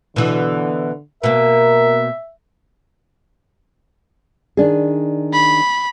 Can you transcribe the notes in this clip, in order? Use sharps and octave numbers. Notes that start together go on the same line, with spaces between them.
B2 D3 E3
B2 A#3 A#4 E5
D#3 D4 G#4
B5